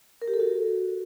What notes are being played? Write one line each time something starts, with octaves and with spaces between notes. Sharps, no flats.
A#4
G4
A4
F#4